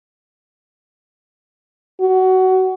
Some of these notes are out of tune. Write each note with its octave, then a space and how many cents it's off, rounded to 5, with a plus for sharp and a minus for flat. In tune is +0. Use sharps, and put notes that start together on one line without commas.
F#4 +20